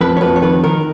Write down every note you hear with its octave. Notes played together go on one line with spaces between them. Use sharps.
F2 B4
C#5
F2 B4
C#5
D#3 B4
D#3 A#4